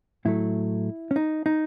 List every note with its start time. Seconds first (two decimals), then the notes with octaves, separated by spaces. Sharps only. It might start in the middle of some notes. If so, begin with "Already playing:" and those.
0.25 A2 F#3 A3 E4
1.11 C#4
1.16 D#4
1.46 D#4